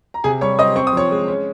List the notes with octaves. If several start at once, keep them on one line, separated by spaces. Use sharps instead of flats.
A#5
C3 G#4 G#5
G3 C#5 C#6
C4 D#5 D#6
C4 C#6
D#6
F3 C#5 C#6
G#3
C#4